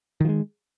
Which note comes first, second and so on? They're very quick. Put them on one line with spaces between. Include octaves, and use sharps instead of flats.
D#3 F3 G#3